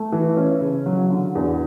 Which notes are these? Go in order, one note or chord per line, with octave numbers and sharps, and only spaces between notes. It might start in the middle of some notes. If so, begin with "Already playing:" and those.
Already playing: A3
E3
C#4
C#3
F#3
D3
E2